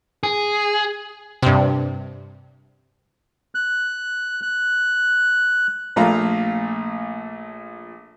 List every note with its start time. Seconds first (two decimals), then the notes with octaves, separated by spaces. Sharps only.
0.23 G#4
1.43 G2 C3
3.55 F#6
4.43 F#6
5.96 A#1 A#2 A3 F5 A#5